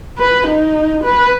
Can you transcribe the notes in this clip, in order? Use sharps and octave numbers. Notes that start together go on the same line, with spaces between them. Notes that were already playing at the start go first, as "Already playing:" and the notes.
B4
D#4
B4